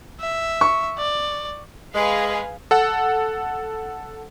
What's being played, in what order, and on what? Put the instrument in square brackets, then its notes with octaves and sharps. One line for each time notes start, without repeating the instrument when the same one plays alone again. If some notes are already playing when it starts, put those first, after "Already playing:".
[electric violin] E5
[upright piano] C#6
[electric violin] D5
[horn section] G#3 [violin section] G#4 B4 F5
[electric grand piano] A4 F#5